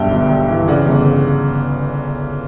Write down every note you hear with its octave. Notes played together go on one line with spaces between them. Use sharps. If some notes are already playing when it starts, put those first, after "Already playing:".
Already playing: B1 G2 E5 G5
G1
G2
E3
C#3 D5 F#5
G1